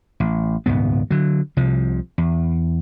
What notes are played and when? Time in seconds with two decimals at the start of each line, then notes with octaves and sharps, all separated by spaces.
0.20 A1
0.66 D#1 C#2 G#2 B3
1.11 D3 F#3
1.57 C2 C3 F3
2.18 E2